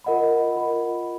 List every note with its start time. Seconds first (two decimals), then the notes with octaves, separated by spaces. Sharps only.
0.04 F4 A#4 D#5 F#5 B5
0.56 F4 A#4 D#5 F#5 B5